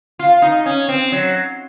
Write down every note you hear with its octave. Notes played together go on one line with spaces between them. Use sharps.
F4
D#4
C#4
C4
F#3